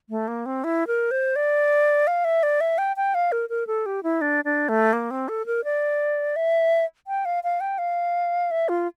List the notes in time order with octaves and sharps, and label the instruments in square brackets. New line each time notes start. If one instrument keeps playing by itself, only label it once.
[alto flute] A3
A#3
C4
E4
A#4
C5
D5
F5
E5
D5
E5
G5
G5
F5
A#4
A#4
A4
G4
E4
D4
D4
A3
A#3
C4
A4
A#4
D5
E5
G5
F5
F5
G5
F5
E5
F4